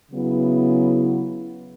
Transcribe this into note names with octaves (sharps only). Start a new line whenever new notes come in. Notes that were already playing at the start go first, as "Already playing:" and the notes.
C#3 F#3 B3 E4